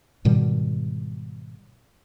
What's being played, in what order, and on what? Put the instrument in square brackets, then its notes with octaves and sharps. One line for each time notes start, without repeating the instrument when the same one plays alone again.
[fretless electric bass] G#2 B2 D#3 G3